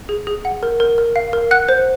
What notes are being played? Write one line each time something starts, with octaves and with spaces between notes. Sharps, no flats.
G#4
G#4
F#5
A#4
A#4
A#4
F5
A#4
F#5 F#6
C5